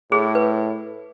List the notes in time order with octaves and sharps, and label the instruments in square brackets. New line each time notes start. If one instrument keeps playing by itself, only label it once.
[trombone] A2 [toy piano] G#4
[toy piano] B4